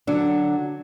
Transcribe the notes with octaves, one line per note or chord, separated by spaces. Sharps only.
D3 F#3 D4